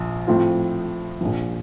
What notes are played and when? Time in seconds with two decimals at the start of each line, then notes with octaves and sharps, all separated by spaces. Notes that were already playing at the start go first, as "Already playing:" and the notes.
Already playing: A#1 F3
0.27 A2 F3 C4 F4
1.21 A#1 A#2 F3